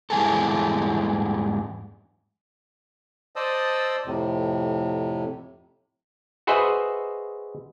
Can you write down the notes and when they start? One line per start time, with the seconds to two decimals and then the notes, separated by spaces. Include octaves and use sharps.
0.10 E2 G#2 E3 G3 G#4 A4
3.36 C5 D5 D#5 A5 D#6 E6
4.06 F2 A2 C3
6.47 F#4 G#4 B4 C5 D#5 E5